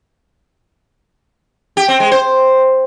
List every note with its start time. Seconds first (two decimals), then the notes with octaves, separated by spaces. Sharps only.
1.77 G4
1.88 C4
2.00 G#3
2.12 C5